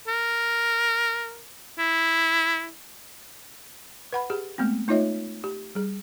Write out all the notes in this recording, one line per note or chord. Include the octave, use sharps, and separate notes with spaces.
A#4
E4
B4 F#5 B5
G4 G#4
G#3 A3 B3 C4
A3 D#4 F4 C#5 D#5 E5
G4
G3 G#4